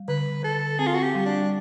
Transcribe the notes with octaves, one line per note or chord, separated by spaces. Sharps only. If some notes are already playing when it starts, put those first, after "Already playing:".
Already playing: G3
D3 B4
D3 A4
C4 G#4
F4
F#4
G4
G3
D4